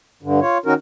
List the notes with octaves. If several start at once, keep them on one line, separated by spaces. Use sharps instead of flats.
G2 D3
F4 C#5
D#3 C#4 D#4 F#4 A#4